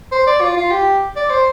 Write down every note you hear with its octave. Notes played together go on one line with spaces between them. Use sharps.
C5
D5
F4
F4
G4
D5
C5